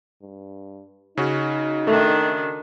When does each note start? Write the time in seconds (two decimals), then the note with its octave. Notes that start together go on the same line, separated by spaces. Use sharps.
0.22 G2
1.17 C#3 C#4 D#4 F#4
1.87 D#3 A3 D4